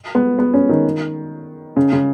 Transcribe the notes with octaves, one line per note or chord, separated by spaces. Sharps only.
B3
B3
C#4
D#3
C#3
C#3